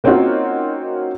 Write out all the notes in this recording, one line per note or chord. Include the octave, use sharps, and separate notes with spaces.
A#3 C4 C#4 D#4 F4 F#4